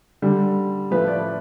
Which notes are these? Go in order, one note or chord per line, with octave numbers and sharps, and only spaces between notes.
D3 G3
A2 F3 A3 B4
D5